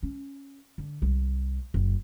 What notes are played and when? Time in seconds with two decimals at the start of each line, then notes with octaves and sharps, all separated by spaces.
0.03 C#4
0.78 D3
1.02 C2
1.74 F#1